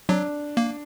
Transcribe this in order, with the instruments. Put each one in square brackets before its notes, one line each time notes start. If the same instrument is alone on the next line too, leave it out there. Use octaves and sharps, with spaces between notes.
[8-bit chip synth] F#3 [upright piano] D4
[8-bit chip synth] A#3